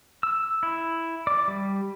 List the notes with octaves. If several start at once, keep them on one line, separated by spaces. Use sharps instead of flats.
E6
E4
D5
G3